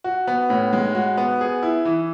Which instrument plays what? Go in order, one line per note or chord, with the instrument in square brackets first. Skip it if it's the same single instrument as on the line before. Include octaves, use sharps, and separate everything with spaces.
[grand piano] F#4
B3
A2
G#3
F#4
B3
G#4
E4
E3